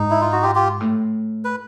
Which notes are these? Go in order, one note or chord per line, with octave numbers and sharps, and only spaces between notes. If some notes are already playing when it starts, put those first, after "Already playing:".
Already playing: G#2 D#4
E4
F4
F#4
F4 G4
F4 G4
A2
B4